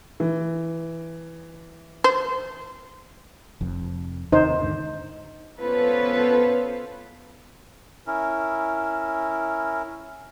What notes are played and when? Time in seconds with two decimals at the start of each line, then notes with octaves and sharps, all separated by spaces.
0.20 E3
2.04 C5
3.61 F1 F2
4.32 D#2 C3 D#3 D#4 C5
4.61 D#2 G#2 D3
5.59 B3 C#4 F4 A4 B4 C5
8.07 C#4 E4 A#4